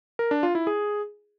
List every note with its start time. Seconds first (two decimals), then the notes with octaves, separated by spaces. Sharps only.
0.19 A#4
0.31 D4
0.43 F4
0.55 E4
0.67 G#4